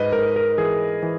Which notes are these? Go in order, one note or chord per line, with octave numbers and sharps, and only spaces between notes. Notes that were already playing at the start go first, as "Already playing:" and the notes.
Already playing: G#2 B4 D#5
G#2 A#4
A#4
E3 G#4
E3